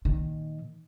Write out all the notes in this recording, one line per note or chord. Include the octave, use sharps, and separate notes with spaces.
A#2 D#3